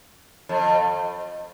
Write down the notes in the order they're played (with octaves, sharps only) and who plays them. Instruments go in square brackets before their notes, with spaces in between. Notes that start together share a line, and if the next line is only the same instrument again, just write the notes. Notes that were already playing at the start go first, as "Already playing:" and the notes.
[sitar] F2